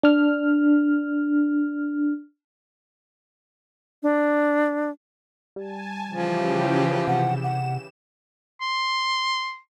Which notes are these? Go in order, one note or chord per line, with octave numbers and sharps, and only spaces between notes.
D4 F6
D4
G3 G#5 A5
C#3 E3 F3 G4
C3 F#5 E7
F#5
C6